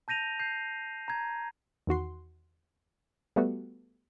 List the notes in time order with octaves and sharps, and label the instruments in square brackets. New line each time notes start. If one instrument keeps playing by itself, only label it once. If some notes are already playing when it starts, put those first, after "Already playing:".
[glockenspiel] A5 G6 A#6 D#7 F7
G6 C7
A#5 G#6
[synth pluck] E2 D#3 F#4 C6
G3 A3 B3 F#4